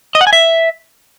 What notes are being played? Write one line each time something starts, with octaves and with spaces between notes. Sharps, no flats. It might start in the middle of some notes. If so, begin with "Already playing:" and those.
D#5
F#5
G#5
E5